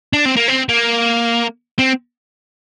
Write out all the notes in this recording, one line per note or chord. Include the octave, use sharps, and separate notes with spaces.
D4
C4
A#3
C4
A#3
C4